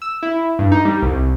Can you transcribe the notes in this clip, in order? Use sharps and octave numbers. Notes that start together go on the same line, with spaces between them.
E6
E4
G2
D#4
G3
C2